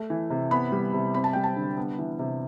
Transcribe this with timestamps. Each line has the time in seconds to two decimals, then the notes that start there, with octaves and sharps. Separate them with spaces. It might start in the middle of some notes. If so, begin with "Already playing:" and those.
Already playing: A3
0.10 E3
0.30 C3
0.51 B3 B5
0.72 G3
0.93 C3
1.14 C4 B5
1.24 A5
1.33 G3 G5
1.44 A5
1.56 D3
1.77 B3
1.98 E3
2.19 C3